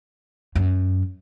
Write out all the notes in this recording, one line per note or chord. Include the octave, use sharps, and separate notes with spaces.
F#2